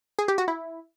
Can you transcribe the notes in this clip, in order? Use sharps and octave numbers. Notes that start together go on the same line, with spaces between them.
G#4
G4
F#4
E4